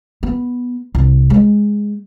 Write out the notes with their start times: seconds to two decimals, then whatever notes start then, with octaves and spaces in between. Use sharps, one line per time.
0.23 B3
0.95 C2
1.30 G#3